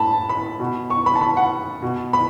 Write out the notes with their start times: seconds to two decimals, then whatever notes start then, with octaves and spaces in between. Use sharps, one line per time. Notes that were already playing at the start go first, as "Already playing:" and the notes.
Already playing: A2 A5 B5
0.29 B5
0.60 B2
0.90 C#6
1.06 B5
1.15 A5
1.21 B5
1.37 F#5
1.82 B2
2.13 B5